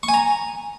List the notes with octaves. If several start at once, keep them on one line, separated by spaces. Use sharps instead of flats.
C#6
G#5
A#5